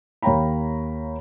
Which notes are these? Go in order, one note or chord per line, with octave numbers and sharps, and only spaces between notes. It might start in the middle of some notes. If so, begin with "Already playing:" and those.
D#2 C#5 F5 G5 A#5 B5